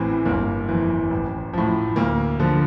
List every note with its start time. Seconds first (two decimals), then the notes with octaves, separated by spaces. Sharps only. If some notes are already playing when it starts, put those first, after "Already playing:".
Already playing: A1 A2 E3 C4
0.25 G1 A#3
0.69 F2 E3
1.11 A1
1.53 A2 F3
1.96 D2 A#3
2.40 D3 F3